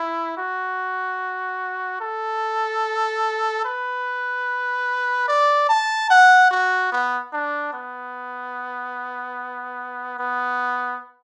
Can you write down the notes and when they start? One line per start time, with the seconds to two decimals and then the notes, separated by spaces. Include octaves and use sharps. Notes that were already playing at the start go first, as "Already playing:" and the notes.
Already playing: E4
0.37 F#4
2.01 A4
3.65 B4
5.28 D5
5.69 A5
6.10 F#5
6.51 F#4
6.92 B3
7.33 D4
7.73 B3
10.19 B3